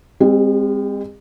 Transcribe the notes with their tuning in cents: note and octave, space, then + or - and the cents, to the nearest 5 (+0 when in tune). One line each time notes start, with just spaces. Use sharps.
G#3 -40 C4 +0 G4 +0